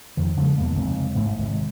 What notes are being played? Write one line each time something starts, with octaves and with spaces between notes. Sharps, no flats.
F2 D#3
C#3 F3 G3 G#3
D#2 G#2 B2 A#3
F1 C#2 C#3 C4
A1 G#2 A3
G#1 C3